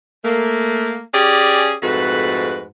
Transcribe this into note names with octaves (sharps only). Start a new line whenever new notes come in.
A3 A#3
C#4 G4 G#4 D5
F2 G#2 A3 F#4 B4